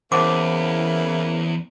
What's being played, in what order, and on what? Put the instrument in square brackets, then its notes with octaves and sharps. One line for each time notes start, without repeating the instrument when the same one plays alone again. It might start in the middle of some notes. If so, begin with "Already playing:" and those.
[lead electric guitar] E2 [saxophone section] C#3 E3 A#3 [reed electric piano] C5 F#5 A5 [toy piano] D6